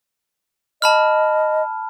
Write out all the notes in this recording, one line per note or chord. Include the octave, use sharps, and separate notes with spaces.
D#5 A5 B5 F6